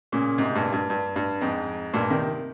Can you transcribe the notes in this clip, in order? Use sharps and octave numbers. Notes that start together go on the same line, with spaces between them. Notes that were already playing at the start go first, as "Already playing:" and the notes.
A#2 C#3
G#2 C3
G2 A#2
G2
G2
G2
F2 G#2
G2 A#2
C3 D#3